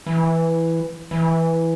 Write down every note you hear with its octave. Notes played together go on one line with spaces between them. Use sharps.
E3
E3